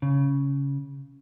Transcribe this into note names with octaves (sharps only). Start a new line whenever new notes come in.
C#3